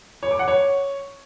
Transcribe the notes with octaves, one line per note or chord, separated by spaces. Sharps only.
C#5
D6
F#5
C#5